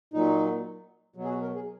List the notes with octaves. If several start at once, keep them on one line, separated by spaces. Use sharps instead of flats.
A#2 F#3 D#4
B2 F#3
G#4
F#4
A#4
G#4